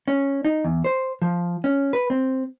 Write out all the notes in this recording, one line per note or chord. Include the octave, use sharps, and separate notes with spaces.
C#4
D#4
E2
C5
F3
C#4
B4
C4